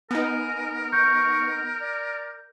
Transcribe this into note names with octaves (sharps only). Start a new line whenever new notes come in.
B3 D#4 A#4 G#5
C#6 G6
D5